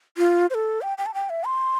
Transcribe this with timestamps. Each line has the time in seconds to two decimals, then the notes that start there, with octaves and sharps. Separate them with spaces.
0.18 F4
0.50 C5
0.54 A4
0.82 G5
0.98 G5
1.06 A5
1.14 G5
1.30 E5
1.46 C6